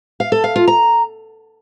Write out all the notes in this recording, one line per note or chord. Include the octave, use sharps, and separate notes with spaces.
F5
A4
F5
F4
A#5